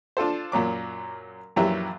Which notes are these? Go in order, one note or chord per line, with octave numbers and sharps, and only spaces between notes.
D4 F4 A4 C5
F#2 A#2 F#3 D6
A#1 F#2 E3 F#3 G4 E5